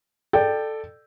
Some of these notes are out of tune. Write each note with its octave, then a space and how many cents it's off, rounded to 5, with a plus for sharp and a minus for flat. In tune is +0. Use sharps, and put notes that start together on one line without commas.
A4 +0 D5 +25 G5 +0